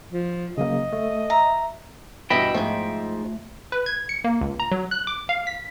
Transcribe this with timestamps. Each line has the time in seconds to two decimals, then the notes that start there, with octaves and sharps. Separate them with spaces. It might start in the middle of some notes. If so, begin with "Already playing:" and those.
0.11 F3
0.57 C#3 F#3 A#3 D#5
0.93 A3
1.30 E5 A#5
2.30 G2 B2 E3 D#5 E5 G5 B5
2.54 G#2 F3 A3
3.72 B4
3.86 G#6
4.09 C#7
4.24 A#3
4.41 C#2
4.60 A#5
4.72 F#3
4.91 F#6
5.07 D6
5.29 F5
5.47 B6